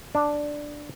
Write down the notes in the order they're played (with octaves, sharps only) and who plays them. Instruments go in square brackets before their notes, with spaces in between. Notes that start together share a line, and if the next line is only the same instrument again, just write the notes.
[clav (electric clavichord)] D4